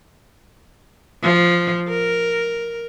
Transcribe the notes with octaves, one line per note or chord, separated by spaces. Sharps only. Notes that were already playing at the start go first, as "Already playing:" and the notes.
F3
A#4